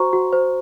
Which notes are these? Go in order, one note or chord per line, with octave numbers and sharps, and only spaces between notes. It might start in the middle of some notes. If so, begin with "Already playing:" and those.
Already playing: F#4 C5 A#5 C#6
F#4
C5